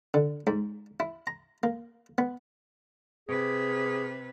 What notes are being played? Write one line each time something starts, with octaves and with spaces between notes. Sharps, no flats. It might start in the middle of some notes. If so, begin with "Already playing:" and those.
D3
G#2
E4
A#5
A#3
B3
C3 G#4 B4